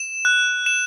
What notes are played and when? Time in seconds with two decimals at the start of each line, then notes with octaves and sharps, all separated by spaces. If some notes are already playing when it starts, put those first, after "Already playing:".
Already playing: E7
0.25 F#6
0.66 E7